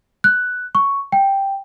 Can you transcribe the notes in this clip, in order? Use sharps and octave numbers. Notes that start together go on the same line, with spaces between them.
F#6
C#6
G5